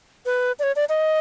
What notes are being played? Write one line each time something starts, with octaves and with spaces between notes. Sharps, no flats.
B4
D5
C#5
D5
D#5